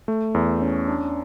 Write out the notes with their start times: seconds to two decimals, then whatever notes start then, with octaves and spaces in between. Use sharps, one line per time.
0.08 A3
0.35 E2
0.61 C#4
0.88 D4